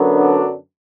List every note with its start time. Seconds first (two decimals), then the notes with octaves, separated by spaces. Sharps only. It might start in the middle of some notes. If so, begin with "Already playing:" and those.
Already playing: F#2 D3 F#3 B3
0.16 D4